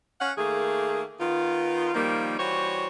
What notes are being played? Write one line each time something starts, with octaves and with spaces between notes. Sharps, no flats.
C#4 F5 F#5
D#3 A3 A#3 G#4
D#3 B3 F4
D#3 F3 G3 A#3 D#4
E3 G3 F#4 C5 C#5